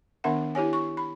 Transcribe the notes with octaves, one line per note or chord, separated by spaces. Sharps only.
D#3 B3 D4 A#4 E5 F#5
E4 G4 C#5 G#5
C#6
B5